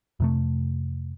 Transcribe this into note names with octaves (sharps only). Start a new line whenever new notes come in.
F2 C3 A3